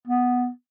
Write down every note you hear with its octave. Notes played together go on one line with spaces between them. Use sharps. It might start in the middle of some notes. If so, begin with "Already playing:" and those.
B3